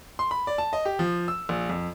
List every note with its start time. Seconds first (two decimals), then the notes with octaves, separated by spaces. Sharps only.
0.19 C6
0.31 B5
0.47 D5
0.58 A5
0.73 D#5
0.85 G4
0.99 F3
1.28 E6
1.49 A#1
1.70 F2